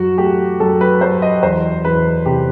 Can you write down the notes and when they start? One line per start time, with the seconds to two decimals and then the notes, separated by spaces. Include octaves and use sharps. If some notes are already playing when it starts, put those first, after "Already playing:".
Already playing: F#2 F#4
0.18 A3 G4
0.60 F#2 A4
0.81 B4
1.01 F#2 C5
1.22 D#5
1.43 E2 C5
1.85 E2 B4
2.26 C3 G4